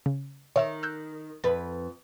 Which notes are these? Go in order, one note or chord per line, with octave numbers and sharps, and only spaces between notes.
C#3
D#3 C#5 E5 E6
E6 F#6 G6
F2 B4 A6